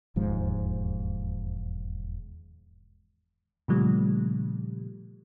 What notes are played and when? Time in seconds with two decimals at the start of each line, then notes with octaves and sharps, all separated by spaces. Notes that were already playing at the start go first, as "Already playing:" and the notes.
0.16 E1 D#2 G#2 F3
3.68 A#2 C#3 F3 G3 A3